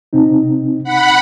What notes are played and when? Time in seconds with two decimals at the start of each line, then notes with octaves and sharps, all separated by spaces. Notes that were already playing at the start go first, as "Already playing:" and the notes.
0.13 C3 C4 D#4
0.84 F#5 B5